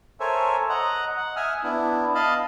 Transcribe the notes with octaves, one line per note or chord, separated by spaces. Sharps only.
A4 A#4 C5 C#5 E5 G#5
D#5 F#5 A#5
F#5
E5 G#5 D#6 F6
B3 D4 E4
D#5 F5 A5 B5